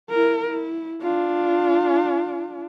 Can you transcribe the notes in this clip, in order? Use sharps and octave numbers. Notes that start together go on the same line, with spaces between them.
E4 A#4
E4
D4 F4